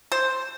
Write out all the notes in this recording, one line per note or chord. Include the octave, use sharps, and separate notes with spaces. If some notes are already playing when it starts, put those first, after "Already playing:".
C5